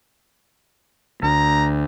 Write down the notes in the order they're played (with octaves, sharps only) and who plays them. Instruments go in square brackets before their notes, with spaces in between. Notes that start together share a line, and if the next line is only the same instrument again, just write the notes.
[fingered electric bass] D2 [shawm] A#5